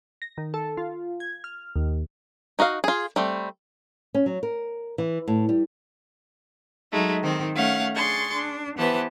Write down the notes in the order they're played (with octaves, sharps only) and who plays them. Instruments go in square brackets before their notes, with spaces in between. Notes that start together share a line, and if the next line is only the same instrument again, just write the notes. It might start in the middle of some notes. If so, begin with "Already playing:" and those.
[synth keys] A#6
D#3
A4
F4
G#6
F6
D#2
[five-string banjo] D#4 F#4 D#5 F5
F4 G#4
G3 A3 C4
[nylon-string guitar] C#4
F#3
A#4
E3
A2
G3
[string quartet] F#3 G#3 A3 D#4
D#3 C4
A3 C#4 F5 F#5
D4 G#4 C6 C#6 A6
D4
E3 B3 G4 B4 C5 A5